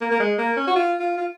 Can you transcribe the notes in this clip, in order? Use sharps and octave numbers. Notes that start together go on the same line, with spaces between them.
A#3
A#3
G#3
A#3
C#4
F#4
F4
F4
F4